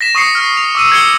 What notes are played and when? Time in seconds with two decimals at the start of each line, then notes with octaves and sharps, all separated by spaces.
0.01 A#6 B6 E7
0.15 C#6 D#6 A#6 C7 C#7
0.35 F6
0.57 F7
0.75 D6 E6 D#7
0.92 G#6 C#7 G7